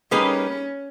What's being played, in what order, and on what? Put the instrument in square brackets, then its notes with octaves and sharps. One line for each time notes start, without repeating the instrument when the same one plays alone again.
[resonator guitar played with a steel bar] G3 A#3 D#4 G#4 B4 [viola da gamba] C#4